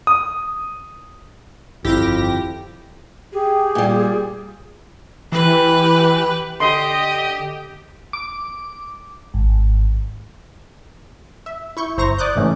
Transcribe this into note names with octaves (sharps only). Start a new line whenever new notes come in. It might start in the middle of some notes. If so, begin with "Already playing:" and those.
D#6
G1 F2 D#3 E4 G4 F5 A#6
G4 G#4
A#2 G3
E3 G4 B4
D3 G4 D#5 C6
D6
G#1
E5
E4 C#6 G6
G1 E4 C5 A#5 C#6 A#6
D5 D6 D#6 F#6 G6
G#2 C#3 E3 A3 C#4 D#4